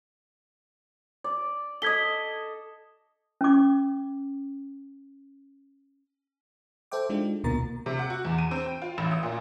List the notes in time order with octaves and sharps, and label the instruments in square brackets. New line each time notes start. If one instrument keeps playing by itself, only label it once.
[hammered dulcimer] D5
[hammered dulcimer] A4 D#5 [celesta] G#6 B6 G7
[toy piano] C#4 D6
[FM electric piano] A4 C5 E5 G5 D6
G#3 D4 D#4 F4 F#4
D2 B2 A#3 A#5 A6
[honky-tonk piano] C3
F#5
F#4
E2
D#7
C4
G5
F4
A1
D#6
A#2